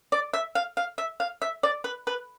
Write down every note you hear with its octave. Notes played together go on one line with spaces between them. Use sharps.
D5
E5
F5
F5
E5
F5
E5
D5
B4
B4